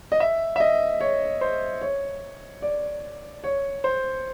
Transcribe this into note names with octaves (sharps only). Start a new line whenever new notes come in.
D#5
E5
E5
D#5
C#5
C5
C#5
D5
C#5
C5